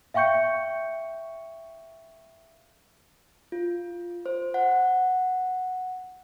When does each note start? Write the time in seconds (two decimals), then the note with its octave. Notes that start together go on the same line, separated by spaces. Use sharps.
0.14 E5 F5 G5 C#6 G6 C#7
3.52 F4
4.26 C5
4.54 F#5